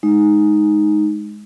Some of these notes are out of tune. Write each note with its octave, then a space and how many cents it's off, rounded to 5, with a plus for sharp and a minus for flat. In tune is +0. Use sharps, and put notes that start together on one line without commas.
G#3 +10 D#4 +0